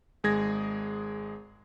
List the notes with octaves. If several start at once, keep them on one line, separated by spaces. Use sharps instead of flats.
G#1 G#3 G#4 G#6 A#6